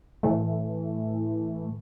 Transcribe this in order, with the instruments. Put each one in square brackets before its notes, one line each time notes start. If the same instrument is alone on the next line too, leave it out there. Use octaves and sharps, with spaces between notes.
[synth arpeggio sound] A2 E3 A3